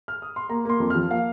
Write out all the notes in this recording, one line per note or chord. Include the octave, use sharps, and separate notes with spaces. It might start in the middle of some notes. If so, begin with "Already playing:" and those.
F6
D#6
C6
A#3 A#5
A#3 C6
F2
F3 F6
A#3 F5